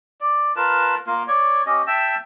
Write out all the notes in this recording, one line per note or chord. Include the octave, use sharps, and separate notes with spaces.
D5
F4 A#4 B4 A5
A#3 F4
C#5 D5
C#4 G4 D#5
E5 G5 A5 E6